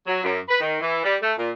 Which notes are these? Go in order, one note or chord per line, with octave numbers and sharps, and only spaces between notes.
F#3
F#2
B4
D#3
E3
G3
A3
A#2